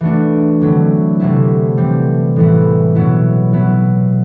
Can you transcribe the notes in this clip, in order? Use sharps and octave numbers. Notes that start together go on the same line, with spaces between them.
E3 A3 D4 F#4
D3 F#3 C4 E4
C3 F#3 A3 E4
E3 G3 C4
A2 E3 B3 E4
B2 F#3 B3 E4
F#3 B3 E4